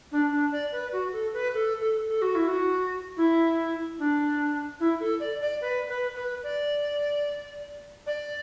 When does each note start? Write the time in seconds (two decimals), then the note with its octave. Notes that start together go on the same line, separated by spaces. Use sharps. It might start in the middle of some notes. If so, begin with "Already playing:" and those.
0.11 D4
0.31 D4
0.51 D5
0.72 B4
0.92 F#4
1.12 A4
1.33 B4
1.54 A4
1.80 A4
2.08 A4
2.21 F#4
2.35 E4
2.48 F#4
3.16 E4
3.99 D4
4.80 E4
5.00 A4
5.20 D5
5.41 D5
5.61 B4
5.88 B4
6.15 B4
6.43 D5
8.06 D5